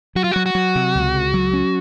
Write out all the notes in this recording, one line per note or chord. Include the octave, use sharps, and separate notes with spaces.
F#3 F#4
F4
F#3 F#4
F#4
F#3
C3
C#2
C#2
F#3
C#4